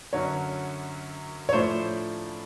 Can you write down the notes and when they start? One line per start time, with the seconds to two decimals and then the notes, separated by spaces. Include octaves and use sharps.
0.13 F#2 D3 F#3 C#5
1.49 C#5
1.52 A2 F3 A3 D4 C5